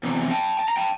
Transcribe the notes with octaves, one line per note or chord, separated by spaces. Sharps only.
E2 C3
G5 A5
A5
A#5
G5 A5